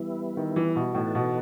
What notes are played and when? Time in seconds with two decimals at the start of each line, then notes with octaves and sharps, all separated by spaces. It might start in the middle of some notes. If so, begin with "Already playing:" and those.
Already playing: E3 G3 B3 E4
0.37 D#3
0.56 E3
0.76 B2
0.94 A2 E3 B3 D#4 F#4 A4
1.15 B2